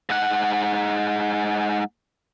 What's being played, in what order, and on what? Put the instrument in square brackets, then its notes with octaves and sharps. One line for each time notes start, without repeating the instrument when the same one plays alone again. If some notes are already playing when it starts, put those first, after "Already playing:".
[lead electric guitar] G#2 F#5